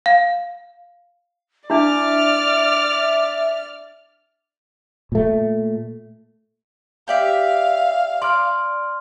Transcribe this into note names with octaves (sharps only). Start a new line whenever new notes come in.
F5
D4 E4 D5 E5 D6 F6
A#2 A3
G4 D5 E5 F5
D5 C6 F6